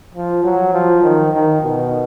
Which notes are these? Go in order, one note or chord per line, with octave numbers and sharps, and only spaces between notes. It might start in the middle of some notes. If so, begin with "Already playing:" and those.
F3
F#3
F3
D#3
D#3
B2